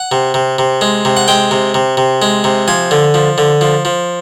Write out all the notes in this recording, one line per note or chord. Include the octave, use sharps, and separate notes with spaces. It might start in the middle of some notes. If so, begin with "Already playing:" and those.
Already playing: F#5
C3
C3
C3
G#3
C3
F#5
G#3 G5
C3
C3
C3
G#3
C3
F3 G#5
D3
F3
D3
F3
F3